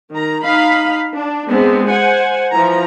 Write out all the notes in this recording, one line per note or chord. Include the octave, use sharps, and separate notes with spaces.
D#3 A#5
D#4 F5 B5
D4
G#3 B3 C4 D4
C5 F#5 G#5
E3 F3 A#5